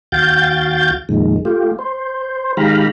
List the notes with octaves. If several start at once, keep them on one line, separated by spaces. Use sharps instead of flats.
D#2 F#4 F5 G5 G6 A6
F2 A#2 D#3 G#3
A3 F4 G4
C5
D#3 G#3 G4 F5 A#5 B5